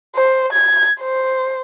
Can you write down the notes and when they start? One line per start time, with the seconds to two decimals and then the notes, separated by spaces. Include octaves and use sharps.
0.15 C5
0.52 G#6
1.01 C5